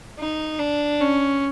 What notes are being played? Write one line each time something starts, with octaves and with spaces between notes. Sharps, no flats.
D#4
D4
C#4